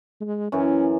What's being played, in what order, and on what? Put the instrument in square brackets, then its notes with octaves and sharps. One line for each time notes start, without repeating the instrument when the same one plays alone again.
[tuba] G#3
[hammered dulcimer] F#2 E3 [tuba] C#4